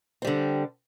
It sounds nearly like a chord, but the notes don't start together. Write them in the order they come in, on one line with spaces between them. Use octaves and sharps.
C4 G3 D3